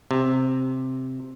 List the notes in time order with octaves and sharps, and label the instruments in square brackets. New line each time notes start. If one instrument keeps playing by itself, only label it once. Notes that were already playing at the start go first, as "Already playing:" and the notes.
[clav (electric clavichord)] C3